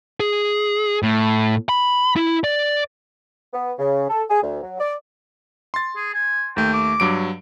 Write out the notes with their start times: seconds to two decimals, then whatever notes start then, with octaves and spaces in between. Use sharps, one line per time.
0.20 G#4
1.03 A2
1.69 B5
2.16 E4
2.44 D5
3.53 B3
3.79 C#3
4.09 A4
4.30 G#4
4.42 D2
4.63 F#3
4.80 D5
5.74 C6 A6
5.96 G#4
6.14 G#5
6.56 D#2 A3 G5
6.73 D6
7.00 G2 F#3 D7